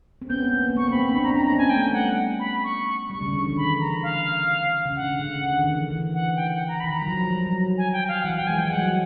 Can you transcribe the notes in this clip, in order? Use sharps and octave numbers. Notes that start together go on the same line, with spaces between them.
C4
B3 C#4 G6
A#3 C4
B3
A#3 C4 C#6
A#3 C4 B5
C4 D4 B5
C4 D4 A#5
C#4 D#4 A#5
C4 D4 A#5
B3 C#4 G#5
A3 G5
G3 F#5
B5
C#6
G3 C#6
C#3
D3
E3
D#3 B5
A#5
F5
C#3
D3 F#5
C#3
D3
D#3
E3
E3
F#5
G5
F#5
A#5
D#3 B5
A#5
F#3
F3
G3
F#3
G#5
G5
F5
E3 F#5
F3 G5
G#3 G#5
G3 G5
F#3 F#5